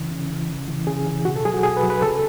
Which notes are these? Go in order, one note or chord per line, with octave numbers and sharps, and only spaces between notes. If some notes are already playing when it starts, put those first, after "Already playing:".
Already playing: C#3 E3
C#3
E3
C#3
E3
C#3 G#4
E3
B2 F#4
A4
F#3 G#4
F#4
B2 G#4
B4
F#3
B4
C#3 A4